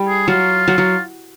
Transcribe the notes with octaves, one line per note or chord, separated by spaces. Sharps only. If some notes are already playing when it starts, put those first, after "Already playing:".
Already playing: G3
G#4
F#3 F4
F#3
F#3